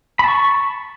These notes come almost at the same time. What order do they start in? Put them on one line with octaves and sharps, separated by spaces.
B5 A5 C#6